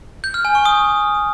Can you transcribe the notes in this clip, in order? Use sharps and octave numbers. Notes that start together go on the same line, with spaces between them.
G6
F6
G#5
C#6
D#6